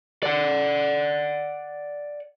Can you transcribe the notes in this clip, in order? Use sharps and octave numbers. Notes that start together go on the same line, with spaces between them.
D5 F#5